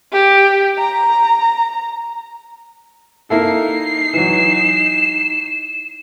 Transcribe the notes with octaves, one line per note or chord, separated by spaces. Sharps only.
G4
A#5
A#3 D#4 E4 A4 C7
E3 F#3 E7